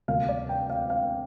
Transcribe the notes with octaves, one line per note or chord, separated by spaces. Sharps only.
D2 C3 G3 A#3 F5
D5
G5
F5
F5